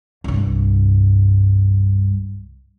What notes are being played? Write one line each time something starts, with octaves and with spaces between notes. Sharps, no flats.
C2 G2